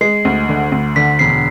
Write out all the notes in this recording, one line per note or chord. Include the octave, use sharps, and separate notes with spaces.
G#3 C7
D2
D3
D2
D3 B6
E1 C7